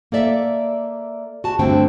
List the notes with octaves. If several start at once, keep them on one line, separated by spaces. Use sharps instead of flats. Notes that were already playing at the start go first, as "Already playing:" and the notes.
A#3 A4 D5 E5
F#4 A5
G2 D3 A3 C4 G5